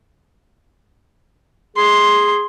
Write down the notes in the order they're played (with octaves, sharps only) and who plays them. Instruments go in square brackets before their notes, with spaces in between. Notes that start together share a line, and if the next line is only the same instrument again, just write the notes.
[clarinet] G#4 [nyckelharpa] C6